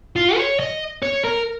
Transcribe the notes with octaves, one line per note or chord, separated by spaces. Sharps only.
F4
C#5
D#5
C#5
A#4